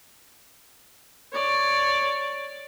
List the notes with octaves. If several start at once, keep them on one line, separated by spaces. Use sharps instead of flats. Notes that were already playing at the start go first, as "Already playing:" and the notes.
C#5 D5